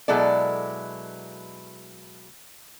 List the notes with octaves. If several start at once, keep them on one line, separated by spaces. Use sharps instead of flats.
B2 F#3 G#3 E4 A4 D5